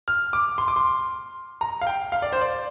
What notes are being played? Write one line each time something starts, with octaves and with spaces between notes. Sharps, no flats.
F6
D6
C6
D6
C6
A#5
F5
G5
F5
D5
C5
D5